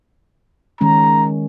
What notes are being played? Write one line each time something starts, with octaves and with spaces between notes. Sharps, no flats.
D#3 G#3 C#4 A#5